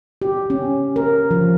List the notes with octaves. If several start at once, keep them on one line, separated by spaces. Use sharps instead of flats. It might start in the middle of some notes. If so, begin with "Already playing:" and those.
G4
C#4
A#4
F3